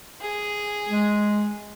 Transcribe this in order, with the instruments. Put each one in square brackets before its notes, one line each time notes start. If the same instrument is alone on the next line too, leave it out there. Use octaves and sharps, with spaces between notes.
[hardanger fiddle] G#4
[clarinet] G#3